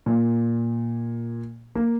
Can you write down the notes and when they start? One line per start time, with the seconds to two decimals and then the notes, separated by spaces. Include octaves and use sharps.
0.06 A#2
1.75 A#3